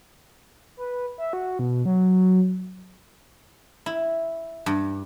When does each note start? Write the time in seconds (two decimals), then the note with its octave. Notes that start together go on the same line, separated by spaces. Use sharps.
0.77 B4
1.18 E5
1.33 F#4
1.59 B2
1.85 F#3
3.86 E4
4.66 G2